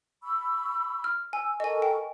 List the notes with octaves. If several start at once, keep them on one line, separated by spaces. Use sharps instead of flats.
B5 C#6 E6
F6
G#5 E6
A4 A#4 D#5 G#5 C#6
G5